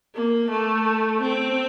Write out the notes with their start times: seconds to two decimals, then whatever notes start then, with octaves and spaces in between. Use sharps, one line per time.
0.14 A#3
0.51 A3
1.22 C4